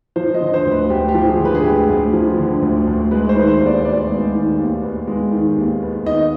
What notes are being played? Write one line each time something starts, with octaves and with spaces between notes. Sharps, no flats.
F3 C5
D#5
D3
C5
D2
B4
D2 G4
G4
F3
G#4
D3
B4
G#4
D2 G4
D2
F3
D3
D2
D2
G#3 B4
C5
D#3 B4
C5
D#2
D5
B3 D5
G#3
D#3
D#2
B3
G#3
D#3
D#2
B3
D#3 D#5